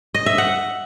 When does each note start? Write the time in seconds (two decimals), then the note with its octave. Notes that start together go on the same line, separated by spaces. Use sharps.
0.14 D#5
0.26 E5
0.38 F#5